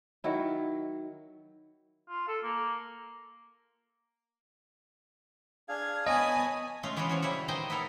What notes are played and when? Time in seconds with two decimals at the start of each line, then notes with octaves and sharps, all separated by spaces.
0.24 D#3 F#3 E4
2.09 F4
2.28 A4
2.43 A#3
5.69 D4 G#4 F5 G#6
6.06 B3 C#5 D#5 G#5 A5 B5 D#6
6.83 G#3 A3 C#4 F4
6.97 E3 B3 C#4 F4 F#4
7.09 F3 C#4 F#4
7.22 A#2 C#3 G3 E4 F#4
7.48 D#3 B4 C5 D#5 G5 G#5
7.70 B3 E4 A4 A#4